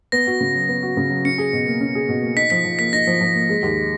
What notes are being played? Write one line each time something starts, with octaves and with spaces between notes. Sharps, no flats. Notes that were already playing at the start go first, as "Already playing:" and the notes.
B3 A#6
F#4
C#3
F#3
B3
F#4
C#3
F#3
C#4 C#7
G#4
B2
A#3
C#4
G#4
B2
A#3
D#4 B6
F3 B6
F3
A#3 B6
D#4 A#6
F3
F3
A#3
G#3
D#2